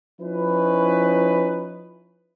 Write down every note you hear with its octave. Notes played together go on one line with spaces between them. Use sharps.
F3 C#4 D#4 E4 B4